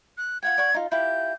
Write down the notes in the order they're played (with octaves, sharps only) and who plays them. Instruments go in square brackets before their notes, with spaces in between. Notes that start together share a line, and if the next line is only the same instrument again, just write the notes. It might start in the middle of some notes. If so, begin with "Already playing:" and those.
[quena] F#6
[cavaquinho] F4 F#5 G5 [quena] G#6
[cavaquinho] D5 F#5 C#6
D#4 F4
[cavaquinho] E4 F4 G4 [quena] G6